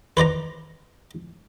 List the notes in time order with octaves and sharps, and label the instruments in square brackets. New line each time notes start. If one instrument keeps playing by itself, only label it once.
[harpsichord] B4 C5 D5 A#5